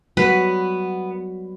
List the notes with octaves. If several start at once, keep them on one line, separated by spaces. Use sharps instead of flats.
F#3 G3 B3 F#4 B4